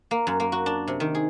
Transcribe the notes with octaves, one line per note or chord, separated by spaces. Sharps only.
A#3
F#2
A#3
F#4
D4
C3
D#3
G#4